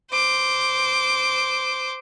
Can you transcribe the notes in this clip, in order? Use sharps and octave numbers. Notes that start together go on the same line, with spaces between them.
C5 D6